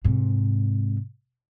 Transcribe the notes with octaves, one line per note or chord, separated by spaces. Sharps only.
G#2 C3